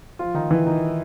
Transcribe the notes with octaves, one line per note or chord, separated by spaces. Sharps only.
F3 F4
D#3 D#4
E3 E4
D#3 D#4